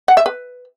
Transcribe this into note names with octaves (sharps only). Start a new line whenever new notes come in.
F#5
E5
B4